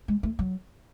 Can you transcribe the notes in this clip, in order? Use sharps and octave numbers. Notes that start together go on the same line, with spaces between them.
G#3
A3
F#3